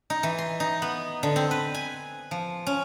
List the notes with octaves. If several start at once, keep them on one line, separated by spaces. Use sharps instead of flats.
D#4
E3
C6
D#4
B3
D3
C4
B4
G#5
F3
C#4